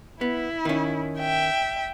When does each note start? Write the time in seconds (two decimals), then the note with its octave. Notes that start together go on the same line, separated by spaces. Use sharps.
0.21 B3 E4
0.65 D#3 C#4
1.18 E5 G5